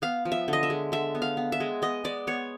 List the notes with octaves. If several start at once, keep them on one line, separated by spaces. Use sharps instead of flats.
B3 F5
F3
E5
D3 D#5
E5
G#3
D3 E5
B3
F5
B3
E5
G#3
B3 D#5
G#3 D5
B3 C#5